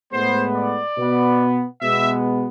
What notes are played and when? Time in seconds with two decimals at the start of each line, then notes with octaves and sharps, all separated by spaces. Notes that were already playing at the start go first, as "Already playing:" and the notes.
0.12 A2 G#3 B3 C5
0.55 D5
0.96 B2 B3
1.81 B2 G#3 B3 E5